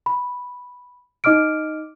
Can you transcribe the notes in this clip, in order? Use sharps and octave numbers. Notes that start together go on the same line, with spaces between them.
B5
D#4 D#5 D6 F6 D7